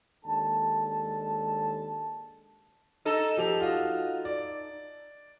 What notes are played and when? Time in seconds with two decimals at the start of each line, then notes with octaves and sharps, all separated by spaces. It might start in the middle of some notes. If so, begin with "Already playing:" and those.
0.25 D#2 G#3 D4 A4 A5
3.05 D#4 A4
3.37 F3 G4 F7
3.60 F4 F#4 D#5
4.25 D5